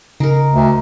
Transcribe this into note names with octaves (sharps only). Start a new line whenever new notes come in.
C#3 D#4 A#4
D2